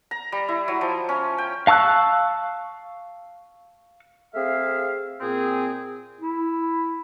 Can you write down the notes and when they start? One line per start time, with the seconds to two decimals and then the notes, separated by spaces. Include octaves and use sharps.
0.11 A#5
0.32 G3
0.48 E4
0.68 F#3
0.81 F3
1.09 C#4
1.38 G5
1.67 F5 A5 C#6 E6 F#6
4.35 A3 C4 G#4 E5 F5
5.20 A#2 C4 G#4
6.21 E4